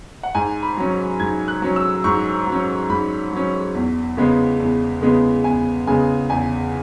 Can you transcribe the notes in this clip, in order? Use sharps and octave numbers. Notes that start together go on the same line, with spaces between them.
F#5
G#2 G#5
B5
F#3 C#4
G#2 G#6
F#6
F#3 C#4
E6
G#2 C#6
F#3
C#4
G#2 B5
F#3 C#4
E2
C#3 G#3 B3
E2
C#3 G#3 B3
E2 G#5
C#3 G#3 B3 G#5
E2 G#5